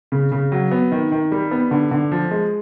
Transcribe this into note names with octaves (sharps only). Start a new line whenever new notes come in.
C#3
C#3
F#3
B3
D#3
D#3
G3
B3
D3
D3
F3
G#3